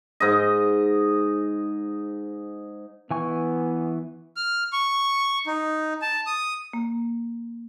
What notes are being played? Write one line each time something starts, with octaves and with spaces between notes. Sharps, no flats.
G#2 D#5
E3 B3 G#5 C#6
F6
C#6
D#4
A5
D#6
A#3